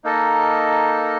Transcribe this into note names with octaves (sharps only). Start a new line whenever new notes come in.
A#3 D#4 A4 D#5